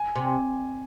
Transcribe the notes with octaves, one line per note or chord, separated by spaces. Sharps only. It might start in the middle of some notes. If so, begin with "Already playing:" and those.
Already playing: G#5
C3
G#5